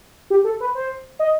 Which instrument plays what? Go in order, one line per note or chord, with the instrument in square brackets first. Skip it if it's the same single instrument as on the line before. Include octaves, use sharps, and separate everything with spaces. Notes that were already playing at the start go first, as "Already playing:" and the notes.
[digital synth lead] G4
A4
B4
C5
D#5